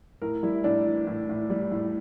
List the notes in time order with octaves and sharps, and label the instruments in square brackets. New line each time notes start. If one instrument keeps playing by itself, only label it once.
[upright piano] A2 A#4
G3 E4
A2 D4
E3
A2
A2
G3
A2